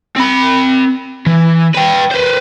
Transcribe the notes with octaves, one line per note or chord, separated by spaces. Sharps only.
C4 B5
E3
B4 G5
B4 C5